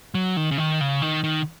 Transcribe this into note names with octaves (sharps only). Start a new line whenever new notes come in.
F#3
D#3
C#3
D#3
C#3
D#3
D#3